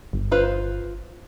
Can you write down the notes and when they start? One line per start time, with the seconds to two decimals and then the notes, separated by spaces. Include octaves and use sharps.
0.13 G1
0.32 F4 B4 C5